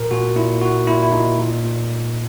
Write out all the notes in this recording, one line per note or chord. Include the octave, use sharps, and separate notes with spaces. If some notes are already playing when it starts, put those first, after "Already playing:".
Already playing: A#2 A#4
A#2 F#4
A#2 E4
A#2 F#4
A#2 E4
E4
A#2 D#4
A#2
A#2